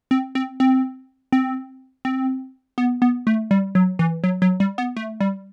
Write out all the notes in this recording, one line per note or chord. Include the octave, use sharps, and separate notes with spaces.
C4
C4
C4
C4
C4
B3
B3
A3
G3
F#3
E3
F#3
F#3
G3
B3
A3
G3